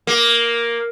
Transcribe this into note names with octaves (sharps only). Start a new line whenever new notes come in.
A#3